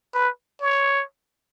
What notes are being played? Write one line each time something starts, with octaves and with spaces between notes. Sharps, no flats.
B4
C#5